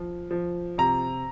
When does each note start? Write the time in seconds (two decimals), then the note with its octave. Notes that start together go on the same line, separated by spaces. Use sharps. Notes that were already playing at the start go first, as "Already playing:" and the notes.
Already playing: F3
0.31 F3
0.78 C3 A#5